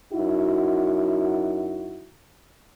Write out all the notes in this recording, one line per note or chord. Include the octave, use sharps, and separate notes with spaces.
F#2 D#4 E4 F#4